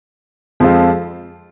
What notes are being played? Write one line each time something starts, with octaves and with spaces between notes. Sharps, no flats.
F2 F3 G#3 C4 F4